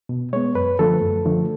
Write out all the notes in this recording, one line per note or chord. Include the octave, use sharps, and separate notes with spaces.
B2
G#3 B3 C#5
F#2 B4
D3 F3 A3 A4
F#2
D3 F3 A3